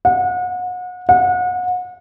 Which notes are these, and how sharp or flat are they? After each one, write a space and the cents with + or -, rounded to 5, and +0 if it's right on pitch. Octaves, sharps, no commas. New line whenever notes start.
F#5 -35
F#5 -35